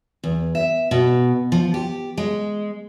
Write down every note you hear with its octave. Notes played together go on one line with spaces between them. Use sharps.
E2
E5
B2
F3
G4
G#3